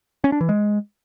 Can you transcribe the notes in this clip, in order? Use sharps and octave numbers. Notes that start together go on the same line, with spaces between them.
C#4
D4
E3
G#3